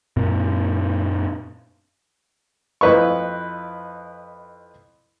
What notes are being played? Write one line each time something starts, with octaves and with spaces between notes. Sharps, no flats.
F#2 A#2 C4
F2 E4 B4 D#5 C#6